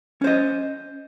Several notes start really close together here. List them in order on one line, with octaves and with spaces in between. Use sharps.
C#4 C5 D#5